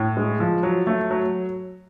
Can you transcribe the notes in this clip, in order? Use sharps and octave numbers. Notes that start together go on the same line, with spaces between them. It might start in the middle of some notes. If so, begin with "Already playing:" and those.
Already playing: A2
G#3
F3
F#3
A3
F#3